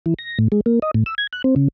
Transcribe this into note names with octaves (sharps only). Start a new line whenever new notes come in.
E3
A#6
A2
G#3
A#3
D#5
A2
E6
G#6
F#6
C4
C#3